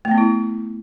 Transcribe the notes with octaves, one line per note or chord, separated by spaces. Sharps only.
A3
B3
E4